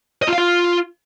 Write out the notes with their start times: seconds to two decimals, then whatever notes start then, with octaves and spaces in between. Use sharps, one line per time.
0.22 D#5
0.28 F4
0.33 F5
0.38 F4